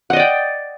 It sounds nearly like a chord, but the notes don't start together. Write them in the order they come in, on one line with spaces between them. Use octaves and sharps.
F#5 D#5 D5 G5